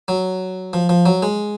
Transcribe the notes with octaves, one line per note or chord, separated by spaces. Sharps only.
F#3
F3
F3
F#3
G#3